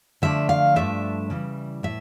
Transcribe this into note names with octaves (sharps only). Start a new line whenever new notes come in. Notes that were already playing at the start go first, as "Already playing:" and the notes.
D3 F3 A3 D4 E5
F5
G2 F3 A3 D4 E5
C#3 E3 G3
A2 E5